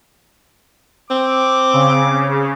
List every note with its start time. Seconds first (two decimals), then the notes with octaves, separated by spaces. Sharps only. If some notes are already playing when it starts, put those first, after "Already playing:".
1.10 C4 D6
1.73 C#3